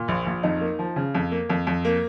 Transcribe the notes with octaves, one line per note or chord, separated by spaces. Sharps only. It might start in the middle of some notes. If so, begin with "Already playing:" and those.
Already playing: A#2
A#1
A#1
F2 D#4
A#3
F3
C#3
F2
A#3
F2
F2
A#3